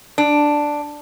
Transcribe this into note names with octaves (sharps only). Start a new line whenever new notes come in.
D4